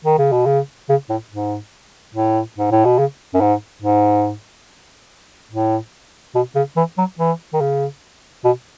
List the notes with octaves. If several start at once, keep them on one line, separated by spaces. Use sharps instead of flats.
D#3
C#3
B2
C#3
C#3
A2
G#2
A2
G#2
A2
B2
C#3
F#2
G#2
G#2
A2
B2
C#3
E3
F#3
E3
D#3
C#3
B2